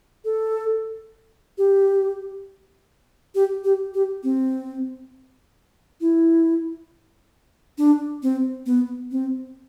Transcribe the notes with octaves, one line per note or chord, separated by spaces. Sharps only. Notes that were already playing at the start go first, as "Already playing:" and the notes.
A4
G4
G4
G4
G4
C4
E4
D4
C4
B3
C4